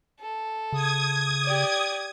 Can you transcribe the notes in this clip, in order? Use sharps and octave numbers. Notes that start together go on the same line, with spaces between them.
A4
C#3 D#6 G#6
G4 D5